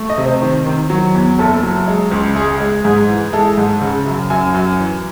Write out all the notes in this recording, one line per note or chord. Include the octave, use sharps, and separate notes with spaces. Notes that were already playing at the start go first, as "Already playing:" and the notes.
Already playing: A3
D#5
C3
C5
D#3
D#3
F#3
E2
F#1 A4
F#3
G#3
C#2
G#3 G#4
G#3
G#2 G#4
E3
G#3 A4
G#2
C#3
F#2
F#2 G#5
F#2
E3